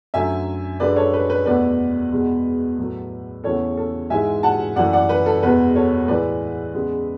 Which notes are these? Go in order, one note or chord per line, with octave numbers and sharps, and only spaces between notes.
F#2 D3 F#3 A3 E5 G#5
F#2 D3 G#3 B4 D5
A4 C#5
B4
B4
E2 B2 A3 B4 D5
E2 B2 G#3
A2 F#3 A3
E2 C#3 E3 A3 A4 C#5
A4
G#2 E3 G#3 E5 G#5
F#5 A5
F#2 E3 A3 D5 F#5
D5 F#5
B4
A4
E2 B2 G#3 B4
A4 C#5
A2 E3 G#3 B4 D5
E2 C#3 G#3